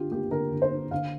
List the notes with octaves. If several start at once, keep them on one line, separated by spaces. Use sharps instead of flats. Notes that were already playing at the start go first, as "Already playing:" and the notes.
Already playing: D3 D4 F4 G4
A#3 G4
D3 A#4
D3
C5
D4
D3 F5